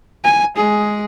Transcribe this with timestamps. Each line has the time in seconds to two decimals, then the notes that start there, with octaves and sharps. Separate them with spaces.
0.24 G#5
0.57 G#3 G#4